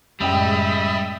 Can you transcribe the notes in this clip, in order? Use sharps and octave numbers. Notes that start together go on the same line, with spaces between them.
F#1 A2 G3 G#3 D#5 E5 G5 B5